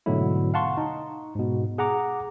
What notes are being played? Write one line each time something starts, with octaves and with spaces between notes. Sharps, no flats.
G#2 B2 D3 F#3 A3 E4
F5 F#5 A5 C6 C#6
D#4
G#2 B2
G#4 F#5 A#5 D6